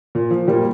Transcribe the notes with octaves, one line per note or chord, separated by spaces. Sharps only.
A#2
F3
A#2 G3 A#3